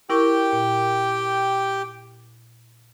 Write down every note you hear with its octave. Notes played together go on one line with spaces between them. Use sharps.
E4 G4 A#4 G5 C#6
A#2